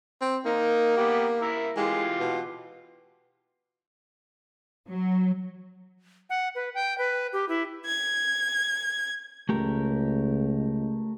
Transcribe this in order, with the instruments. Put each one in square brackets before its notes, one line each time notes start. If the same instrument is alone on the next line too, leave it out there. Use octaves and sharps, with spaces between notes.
[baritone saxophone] C4
[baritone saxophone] A#3 [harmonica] D#4 A#4
[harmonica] B3 G4
E4 A#4 E5
[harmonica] E3 F4 G4 [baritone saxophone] G#3
[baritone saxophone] B2
[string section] F#3
[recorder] F#5
B4
G5
B4
G4
E4
[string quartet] G#6
[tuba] C#2 [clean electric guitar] A3 G4 A#4